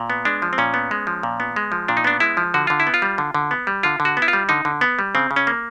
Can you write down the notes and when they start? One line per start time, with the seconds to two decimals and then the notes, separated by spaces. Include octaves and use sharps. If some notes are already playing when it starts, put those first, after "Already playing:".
Already playing: A#2
0.10 B3
0.25 G#3 D4
0.42 F3
0.53 C4
0.58 A#2 C#4
0.74 B3
0.91 G#3
1.07 F3
1.23 A#2
1.40 B3
1.56 G#3
1.72 F3
1.88 A#2 D4
1.97 D#4
2.04 B3 D4
2.20 G#3 E4
2.37 F3
2.54 D3 F#4
2.67 D3 F4
2.80 E4
2.87 B3
2.94 F4
3.02 G3
3.18 D3
3.35 D3
3.51 B3
3.67 G3
3.83 D3 F4
4.00 D3
4.05 F#4
4.17 B3
4.22 E4
4.28 F4
4.33 G3
4.49 D3 D#4
4.65 D3
4.81 B3
4.99 G3
5.15 C#3 C4
5.31 C#3
5.36 C#4
5.47 A#3